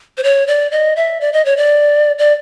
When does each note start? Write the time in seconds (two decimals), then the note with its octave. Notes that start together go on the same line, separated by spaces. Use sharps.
0.18 C5
0.24 C#5
0.47 D5
0.71 D#5
0.96 E5
1.21 D5
1.33 D#5
1.45 C#5
1.57 D5
2.18 D5